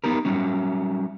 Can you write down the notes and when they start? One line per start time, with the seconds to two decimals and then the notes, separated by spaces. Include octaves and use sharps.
0.04 B3 D#4 G4 A#4
0.25 F#3 G3 C#4